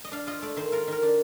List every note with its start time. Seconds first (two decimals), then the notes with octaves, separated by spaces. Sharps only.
0.04 D#5
0.12 D4 F5
0.27 F4 D#5
0.42 A3 D5
0.57 D#3 C5
0.72 F4 A#4
0.88 D#3 A#4
1.03 D4